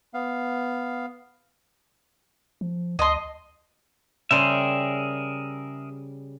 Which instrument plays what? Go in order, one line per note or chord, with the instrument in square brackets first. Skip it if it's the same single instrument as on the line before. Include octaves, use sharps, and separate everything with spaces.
[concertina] B3 F5
[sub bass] F3
[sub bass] D2 [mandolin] D#5 C6
[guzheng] C#3 G3 C5 [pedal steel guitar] G#4 A#4 E5